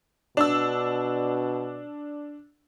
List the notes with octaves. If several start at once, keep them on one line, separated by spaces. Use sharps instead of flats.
B2 D4 E6